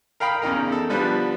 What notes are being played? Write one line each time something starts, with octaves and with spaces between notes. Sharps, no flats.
A#4 F5 G5 B5 D#6
E2 C#3 D#4 A#4
A4
D3 F3 G3 B3